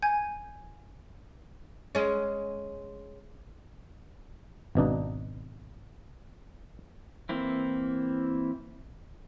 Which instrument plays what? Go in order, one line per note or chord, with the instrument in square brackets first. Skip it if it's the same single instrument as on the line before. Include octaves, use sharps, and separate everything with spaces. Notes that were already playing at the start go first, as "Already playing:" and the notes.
[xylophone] G#5 G6 G#6
[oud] G#3 C#4
[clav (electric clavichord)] G#1 B2 D4 D#4
[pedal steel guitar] E3 A#3 C4 E4